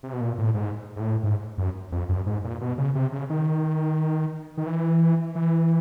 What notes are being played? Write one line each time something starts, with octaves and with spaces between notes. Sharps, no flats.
C3
B2
A#2
A2
G#2
G#2
A2
G#2
F#2
F2
F#2
G#2
A#2
B2
C#3
C3
C#3
D#3
D#3
E3
E3